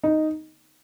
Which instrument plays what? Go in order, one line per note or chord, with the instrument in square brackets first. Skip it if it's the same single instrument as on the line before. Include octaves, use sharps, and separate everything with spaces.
[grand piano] D#4